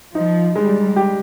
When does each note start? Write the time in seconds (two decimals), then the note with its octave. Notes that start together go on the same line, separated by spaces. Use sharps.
0.15 F3 D#4
0.55 G3 G#3
0.96 G4